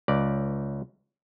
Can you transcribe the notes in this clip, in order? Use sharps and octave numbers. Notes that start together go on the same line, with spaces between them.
C#2 D5